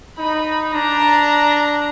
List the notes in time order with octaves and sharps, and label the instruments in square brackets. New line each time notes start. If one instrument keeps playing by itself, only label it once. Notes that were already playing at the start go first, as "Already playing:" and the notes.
[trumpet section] D#4 [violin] B5
[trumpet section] D4 [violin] A#5